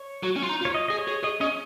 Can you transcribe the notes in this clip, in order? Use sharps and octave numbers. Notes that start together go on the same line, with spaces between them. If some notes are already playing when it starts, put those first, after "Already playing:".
Already playing: C#5
F#3
C#4
F4
D#4
F4
C#5
D#5
G#4 D#5
C#5
G#4
G#4 D#5
C#4 D#5